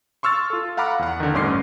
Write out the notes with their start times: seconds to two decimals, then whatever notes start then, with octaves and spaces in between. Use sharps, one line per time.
0.23 C6 C#6 E6 F6 A6
0.50 F4 A4
0.77 F5 F#5 A#5 B5 D6 F6
0.99 E2 F#5
1.20 D3 D#3
1.33 A1 G2 C#4 C6 D6 C7